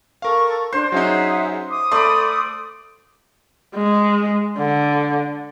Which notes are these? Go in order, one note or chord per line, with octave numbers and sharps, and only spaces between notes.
A4 A#4 F5 C#6
D4 C5 C6
F#3 C#4 D#4 G#4 E5 F#5
D6 D#6
A3 D5 B5 C6
G#3
D3